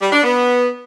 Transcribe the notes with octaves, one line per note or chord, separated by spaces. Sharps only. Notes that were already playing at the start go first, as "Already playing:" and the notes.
G3
D4
B3